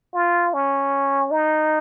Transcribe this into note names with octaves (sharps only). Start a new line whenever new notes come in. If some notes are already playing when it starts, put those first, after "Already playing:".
F4
C#4
D#4